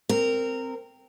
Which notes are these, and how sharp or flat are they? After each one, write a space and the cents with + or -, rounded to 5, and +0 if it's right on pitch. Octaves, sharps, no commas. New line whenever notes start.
C4 +0 A#4 -15